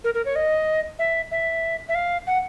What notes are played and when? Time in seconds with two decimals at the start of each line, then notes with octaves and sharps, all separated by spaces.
0.04 A#4
0.14 A#4
0.25 C#5
0.35 D#5
0.99 E5
1.31 E5
1.89 E5
1.95 F5
2.27 F#5